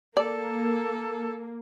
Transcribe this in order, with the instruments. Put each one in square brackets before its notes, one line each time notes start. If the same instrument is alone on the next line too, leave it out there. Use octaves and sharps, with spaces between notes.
[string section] A#3 [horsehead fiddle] A4 [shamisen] D5